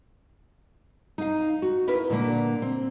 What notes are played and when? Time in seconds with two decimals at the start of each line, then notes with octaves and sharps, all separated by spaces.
1.18 D#4 F5
1.62 F#4
1.88 E4 A#4 B4
2.10 A#2 D3 A#3
2.62 C4